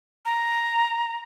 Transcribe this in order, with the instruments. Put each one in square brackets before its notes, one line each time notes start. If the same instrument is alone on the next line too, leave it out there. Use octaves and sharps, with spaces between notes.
[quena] A#5